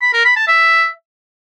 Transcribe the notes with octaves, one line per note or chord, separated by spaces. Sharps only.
B5
A#4
B5
A5
E5